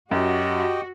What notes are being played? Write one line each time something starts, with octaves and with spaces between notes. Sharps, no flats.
F#2 F#4 G4 D#5 G5